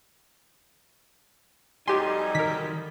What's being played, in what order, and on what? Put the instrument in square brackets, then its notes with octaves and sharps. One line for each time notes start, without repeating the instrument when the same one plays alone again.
[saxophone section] F2 F#3 G3 [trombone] D#4 [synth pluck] G4 C6 [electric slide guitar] G#5
[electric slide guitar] D#3 [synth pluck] A#4 B6